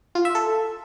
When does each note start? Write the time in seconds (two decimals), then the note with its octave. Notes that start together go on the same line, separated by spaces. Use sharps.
0.15 F4
0.25 E5
0.35 A4